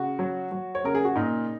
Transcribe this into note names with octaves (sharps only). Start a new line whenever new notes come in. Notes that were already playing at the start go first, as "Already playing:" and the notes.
Already playing: C#3 F#4
F#3
F#3
C#5
C#3 A#4
G#4
F#4
A#2 D#4